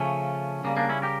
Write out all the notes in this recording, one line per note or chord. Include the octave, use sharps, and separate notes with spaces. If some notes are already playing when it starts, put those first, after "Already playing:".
Already playing: C#3 F3 A3 C#4
C#3 G3 A#3
A#3 D4
C#4 E4
G4 A#4